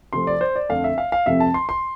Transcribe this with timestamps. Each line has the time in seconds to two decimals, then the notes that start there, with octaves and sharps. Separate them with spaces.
0.13 C3 F3 A3 C4 C6
0.27 D5
0.41 C5
0.56 D5
0.69 F2 D3 A3 F5
0.84 E5
0.98 F5
1.12 F5
1.26 F2 C3 F3 A3 C4 E5
1.40 A5
1.54 C6
1.69 C6